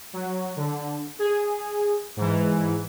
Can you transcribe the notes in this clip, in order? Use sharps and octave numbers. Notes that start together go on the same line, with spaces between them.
F#3
D3
G#4
G#2 E3